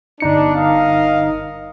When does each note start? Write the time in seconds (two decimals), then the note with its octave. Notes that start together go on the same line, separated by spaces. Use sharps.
0.20 G1 D4 D#4 C#7
0.55 A#4 D#5 F5